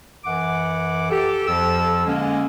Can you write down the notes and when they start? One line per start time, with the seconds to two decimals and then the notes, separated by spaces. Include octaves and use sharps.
0.25 F#2 E3 F#5 D6
1.10 G4 A4
1.47 F2 F3 A4 E6
2.07 D3 G#3 A#3 C#4